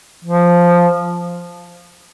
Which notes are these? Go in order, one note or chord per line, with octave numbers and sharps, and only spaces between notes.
F3